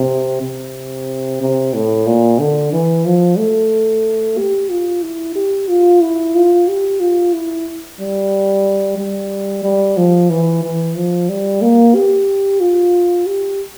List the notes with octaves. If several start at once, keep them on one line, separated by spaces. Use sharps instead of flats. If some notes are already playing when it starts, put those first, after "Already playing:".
Already playing: C3
C3
C3
A2
A#2
D3
E3
F3
A3
G4
F4
E4
G4
F4
E4
F4
G4
F4
E4
G3
G3
G3
F3
E3
E3
F3
G3
A#3
G4
F4
G4